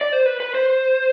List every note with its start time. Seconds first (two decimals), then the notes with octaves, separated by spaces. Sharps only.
0.01 D5
0.13 C5
0.26 B4
0.40 B4
0.55 C5